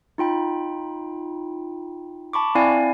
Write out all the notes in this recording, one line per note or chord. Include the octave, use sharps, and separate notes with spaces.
D#4 F4 G5 B5
A5 B5 C#6 D6
C4 E4 D5 F5 G#5